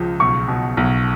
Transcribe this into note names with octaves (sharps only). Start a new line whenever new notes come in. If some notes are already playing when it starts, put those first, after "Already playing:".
Already playing: C#2 F3
B1 C#6
B2
B1